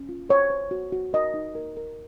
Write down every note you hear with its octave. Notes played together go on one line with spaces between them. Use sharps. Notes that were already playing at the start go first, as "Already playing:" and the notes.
Already playing: C#4
F4
C5 C#5
C5
F#4
F#4
A#4 D#5
D#4
A#4
A#4